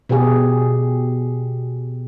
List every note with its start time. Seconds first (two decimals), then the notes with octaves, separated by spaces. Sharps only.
0.09 B2 G4 G#4